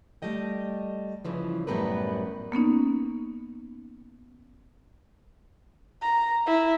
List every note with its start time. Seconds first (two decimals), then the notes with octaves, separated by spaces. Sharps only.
0.22 G3 A3 D#5 G5
1.25 G2 C#3 E3 F3
1.67 F#2 A2 G3 B3 A#4 B4
2.52 A#3 B3 C#4 D#4
6.02 A#5
6.46 E4